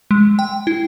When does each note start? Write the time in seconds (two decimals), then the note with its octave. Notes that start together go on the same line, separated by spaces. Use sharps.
0.11 G#3
0.39 G5
0.67 E4